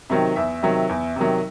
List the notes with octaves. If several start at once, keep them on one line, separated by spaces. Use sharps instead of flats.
C3 D#3 F#3
E2 E5
C3 D#3 F#3
E2
C3 D#3 F#3